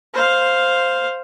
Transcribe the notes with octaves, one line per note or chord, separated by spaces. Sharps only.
C5 F5